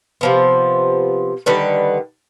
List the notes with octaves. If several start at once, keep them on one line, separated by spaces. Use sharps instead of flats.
C3 F3 B3
D3 D#3 G3 B4